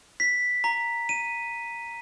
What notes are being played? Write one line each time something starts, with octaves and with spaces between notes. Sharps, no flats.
B6
A#5
D#7